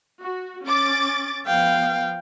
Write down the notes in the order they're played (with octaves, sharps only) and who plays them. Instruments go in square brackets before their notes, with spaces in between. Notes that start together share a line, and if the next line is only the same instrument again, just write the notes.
[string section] F#4
C#4 D6 A6
[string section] F3 B3 [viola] F5 G5